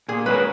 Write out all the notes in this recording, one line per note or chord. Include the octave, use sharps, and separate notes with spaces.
A#2 G#4
G#3 C#4 F#4 A#4 B4